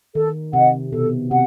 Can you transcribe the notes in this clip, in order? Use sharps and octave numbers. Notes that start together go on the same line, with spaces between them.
D#3 A4
C3 D#5 F#5
B2 A4
C3 F#5